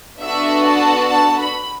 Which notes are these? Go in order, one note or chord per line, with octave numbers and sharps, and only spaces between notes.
B3 D4 F#4 A4 E5
A5
A5
B5